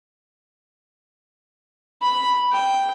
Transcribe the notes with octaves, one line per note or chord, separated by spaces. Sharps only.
B5
G5